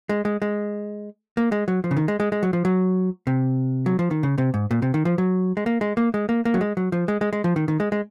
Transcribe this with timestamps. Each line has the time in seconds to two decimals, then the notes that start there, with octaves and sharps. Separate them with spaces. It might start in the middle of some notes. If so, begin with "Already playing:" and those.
0.09 G#3
0.25 G#3
0.42 G#3
1.37 A#3
1.52 G#3
1.68 F#3
1.84 F3
1.91 C#3
1.97 D#3
2.08 G#3
2.20 G#3
2.32 G#3
2.43 F#3
2.53 F3
2.65 F#3
3.27 C3
3.86 F#3
3.99 F3
4.11 D#3
4.23 C#3
4.38 C3
4.54 G#2
4.71 A#2
4.82 C3
4.94 D#3
5.05 F3
5.18 F#3
5.57 G#3
5.66 A#3
5.81 G#3
5.97 A#3
6.14 G#3
6.29 A#3
6.45 A#3
6.54 F#3
6.61 G#3
6.77 F#3
6.92 F3
7.08 G#3
7.21 G#3
7.33 G#3
7.44 F3
7.56 D#3
7.68 D#3
7.80 G#3
7.92 G#3